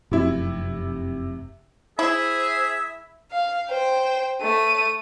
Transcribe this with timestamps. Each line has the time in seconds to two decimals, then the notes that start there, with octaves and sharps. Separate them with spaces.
0.12 F1 F#2 C3 E4
1.99 E4 G#4 C5 E5
3.31 F5
3.70 C5 G5
4.41 A3 D#7